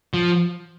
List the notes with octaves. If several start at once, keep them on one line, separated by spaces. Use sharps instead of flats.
F3